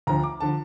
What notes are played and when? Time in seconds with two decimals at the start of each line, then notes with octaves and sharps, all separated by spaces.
0.07 D2 D3 F3 A#5
0.24 D6
0.40 D3 F3 A5